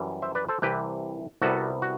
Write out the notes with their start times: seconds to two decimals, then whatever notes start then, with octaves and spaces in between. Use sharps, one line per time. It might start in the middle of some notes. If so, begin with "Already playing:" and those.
Already playing: F#2 E3 G3
0.22 C5 E5
0.35 B4 D5
0.49 A4 C5
0.62 C2 C3 E3 G4 B4
1.42 C2 C3 G3 B3 F#4 A4
1.82 F#4